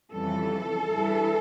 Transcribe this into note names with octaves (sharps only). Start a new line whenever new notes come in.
F2 C#3 E3 G3 A4
G2 E3 G3